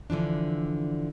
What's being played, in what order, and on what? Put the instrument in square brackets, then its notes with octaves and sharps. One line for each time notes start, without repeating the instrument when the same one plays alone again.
[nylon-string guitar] D3 E3 F3 D4